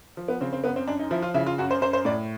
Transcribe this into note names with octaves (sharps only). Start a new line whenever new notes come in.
F3
B3
C#3 C4
C4
F#2 B3
C4
F#2 D4
D#4
F3 E4
F4
C#3 E4
F4
F#2 F#4
C5
F#2 C5
C5
A2 D5